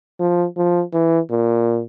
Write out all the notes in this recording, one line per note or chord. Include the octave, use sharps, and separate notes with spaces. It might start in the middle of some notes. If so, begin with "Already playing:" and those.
F3
F3
E3
A#2